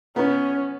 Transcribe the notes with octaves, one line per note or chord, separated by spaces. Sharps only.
B3 C#4